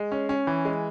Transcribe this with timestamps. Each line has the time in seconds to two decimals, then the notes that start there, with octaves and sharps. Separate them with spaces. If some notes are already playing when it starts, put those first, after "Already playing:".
Already playing: G#3
0.12 C#4
0.29 C#4
0.47 E3
0.65 G#3